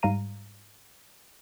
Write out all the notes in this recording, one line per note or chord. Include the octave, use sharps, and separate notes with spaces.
G#2 G3 F5 A#5 D#7